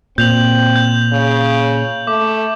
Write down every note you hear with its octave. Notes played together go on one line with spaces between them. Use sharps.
A#2 C4 G6 F7 F#7
G6
C#3
A3 D6